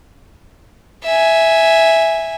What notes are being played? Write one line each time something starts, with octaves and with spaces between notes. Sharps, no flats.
E5 G#5